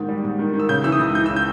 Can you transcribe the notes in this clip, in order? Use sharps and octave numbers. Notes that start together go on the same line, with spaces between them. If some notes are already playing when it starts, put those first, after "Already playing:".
Already playing: G#2 D#3
G3
G#2
D#3
D#3
E6
C#3 G6
E3 E6
D#6
C#2
E3 G6
C#3 E6
G6